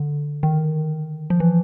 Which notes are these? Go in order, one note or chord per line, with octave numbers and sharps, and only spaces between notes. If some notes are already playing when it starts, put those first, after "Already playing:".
Already playing: D3
D#3
F3
E3